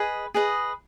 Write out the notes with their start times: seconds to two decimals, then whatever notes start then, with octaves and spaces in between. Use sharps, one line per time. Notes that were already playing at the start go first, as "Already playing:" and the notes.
Already playing: G#4 B4 D#5
0.34 G#4 B4 D#5